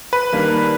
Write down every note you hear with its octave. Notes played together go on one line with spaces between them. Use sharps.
B4
D#3 G3 A#3 D4